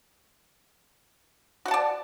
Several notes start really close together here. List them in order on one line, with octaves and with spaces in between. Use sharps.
F#4 F#5 A5 D5